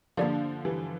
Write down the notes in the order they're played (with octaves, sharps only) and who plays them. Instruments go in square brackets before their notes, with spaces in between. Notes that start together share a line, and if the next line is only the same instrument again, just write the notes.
[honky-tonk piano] D3 F3 [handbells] A#3 D4 G4 D5 F5
[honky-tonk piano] E3 G3